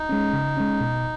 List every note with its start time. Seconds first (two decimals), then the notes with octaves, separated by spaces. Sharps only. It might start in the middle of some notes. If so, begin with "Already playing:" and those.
Already playing: D#4
0.09 G#3 C#4
0.33 C#3
0.57 G#3 C#4
0.81 B2